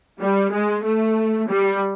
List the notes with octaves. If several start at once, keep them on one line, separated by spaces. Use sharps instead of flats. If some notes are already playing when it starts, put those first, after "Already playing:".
G3
G#3
A3
G3